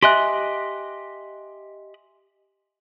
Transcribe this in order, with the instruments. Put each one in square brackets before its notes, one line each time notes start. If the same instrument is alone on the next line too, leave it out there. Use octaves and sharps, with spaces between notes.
[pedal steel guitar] G4 D#5 F#6 [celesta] E5 G#5 C6